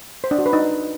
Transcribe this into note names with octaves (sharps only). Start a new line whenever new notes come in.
C5
D4
F#4
B4
D#4